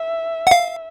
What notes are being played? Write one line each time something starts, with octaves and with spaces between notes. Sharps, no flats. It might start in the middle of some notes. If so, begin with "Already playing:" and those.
Already playing: E5
F#5
F5